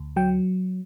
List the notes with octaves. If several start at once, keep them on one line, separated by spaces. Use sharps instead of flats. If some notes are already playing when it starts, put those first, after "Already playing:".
Already playing: D2
F#3 G5